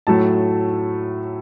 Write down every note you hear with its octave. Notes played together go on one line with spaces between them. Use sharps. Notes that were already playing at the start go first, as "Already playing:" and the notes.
A2 F#3 A3 A5